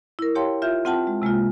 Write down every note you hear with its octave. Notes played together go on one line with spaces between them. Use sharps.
E4 A#4
G4 C#5 F5 G5 A5 C6
F4 E5 G6
C4 F4 F#5 G5 A5
G#3
C3 G#3 A#3 F4